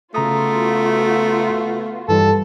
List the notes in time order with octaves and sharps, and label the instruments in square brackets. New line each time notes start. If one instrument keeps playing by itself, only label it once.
[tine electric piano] C#3 A#5 D#6 [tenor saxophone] A3 [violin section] B3 F4 F#4
[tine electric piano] G2 E3 G3 [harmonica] A4